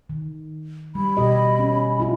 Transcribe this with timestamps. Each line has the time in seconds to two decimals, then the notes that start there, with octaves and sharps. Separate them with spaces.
0.09 D#3
0.95 G3 B5
1.17 B2 G4 D#5
1.59 C#4
2.00 E4 F4